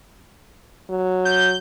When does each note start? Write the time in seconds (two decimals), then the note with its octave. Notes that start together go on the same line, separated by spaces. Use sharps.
0.90 F#3
1.25 G6